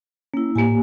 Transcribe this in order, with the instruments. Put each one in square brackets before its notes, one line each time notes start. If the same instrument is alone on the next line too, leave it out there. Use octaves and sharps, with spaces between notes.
[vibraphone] A#3 E4 [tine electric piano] C#4
[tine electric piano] A2 [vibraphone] A#3 G4 G#5